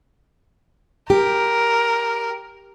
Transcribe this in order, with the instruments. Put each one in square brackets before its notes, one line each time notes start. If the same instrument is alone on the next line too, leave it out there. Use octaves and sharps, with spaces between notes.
[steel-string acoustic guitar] G4 [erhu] A#4